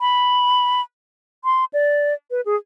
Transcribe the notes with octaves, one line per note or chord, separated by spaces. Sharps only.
B5
C6
D5
B4
G#4